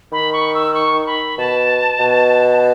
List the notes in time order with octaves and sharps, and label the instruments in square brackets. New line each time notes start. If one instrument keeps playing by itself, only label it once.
[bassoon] D#3 [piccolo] B5
[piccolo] C#6
E6
C#6
C#6
B5
[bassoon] B2 [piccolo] A5
[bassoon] B2